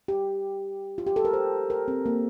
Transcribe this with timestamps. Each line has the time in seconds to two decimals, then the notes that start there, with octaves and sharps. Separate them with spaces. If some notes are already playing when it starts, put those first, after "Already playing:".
0.08 G4
0.98 F4
1.07 G4
1.16 A4
1.25 A#4
1.33 C5
1.70 A#4
1.88 C4
2.06 A#3